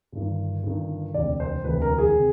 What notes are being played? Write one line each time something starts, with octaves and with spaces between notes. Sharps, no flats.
G1 G2 D#3
G1 G2 D#3
E1 D2 C3 D5
C5
E1 D2 C3 B4
A#4
G#4
C3